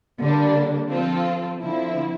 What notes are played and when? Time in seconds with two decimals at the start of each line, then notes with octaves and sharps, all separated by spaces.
0.19 D3 G3 A#3 D4
0.89 F3 C4 F4 A4
1.59 D3 F3 C4 E4